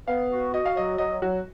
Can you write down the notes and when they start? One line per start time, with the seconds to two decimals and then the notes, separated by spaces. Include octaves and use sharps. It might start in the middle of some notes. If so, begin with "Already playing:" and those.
0.08 B3 F5
0.30 F#4
0.54 F#4 D#5
0.66 F5
0.76 F#3 D#5
0.98 F#3 D#5
1.21 F#3 F#4